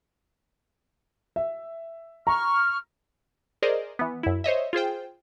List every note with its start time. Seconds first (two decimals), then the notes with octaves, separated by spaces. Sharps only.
1.36 E5
2.27 A#5 C#6 F6
3.62 G#4 A#4 C5 D5 D#5
3.99 E3 B3
4.23 F#2 E4
4.44 C5 C#5 D#5 E5
4.73 F4 G#4 C5 G5